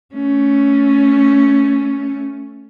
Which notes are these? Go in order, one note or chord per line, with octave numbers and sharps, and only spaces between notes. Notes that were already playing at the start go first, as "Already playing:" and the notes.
A3 C#4